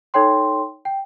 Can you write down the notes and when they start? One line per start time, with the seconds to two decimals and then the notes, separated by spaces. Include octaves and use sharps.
0.14 D#4 A4 C#5 G5 C6
0.85 G5